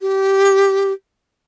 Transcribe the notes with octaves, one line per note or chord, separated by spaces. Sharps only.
G4